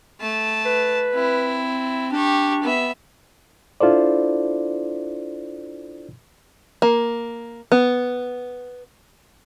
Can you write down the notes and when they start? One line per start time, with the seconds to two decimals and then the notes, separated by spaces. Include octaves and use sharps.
0.21 A3 A5
0.66 B4
1.14 C4 E4
2.12 D4 G4 C#6
2.63 B3 E5
3.81 D4 E4 F4 A4 C5 D5
6.82 A#3
7.72 B3